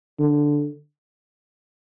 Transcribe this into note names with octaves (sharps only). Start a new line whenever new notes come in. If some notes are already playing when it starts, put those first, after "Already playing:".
D3